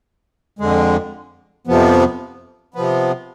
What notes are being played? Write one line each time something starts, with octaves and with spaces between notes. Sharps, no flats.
F2 D3 G#3
F2 C3 F3 B3
C3 F3 B3